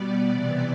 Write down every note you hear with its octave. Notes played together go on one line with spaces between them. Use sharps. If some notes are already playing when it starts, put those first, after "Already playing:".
Already playing: B2 G3 B3 D5
C3 E3 B3